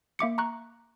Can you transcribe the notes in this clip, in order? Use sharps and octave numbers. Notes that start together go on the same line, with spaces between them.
A#3 E5 D6 C#7
A#5 C#6 F#6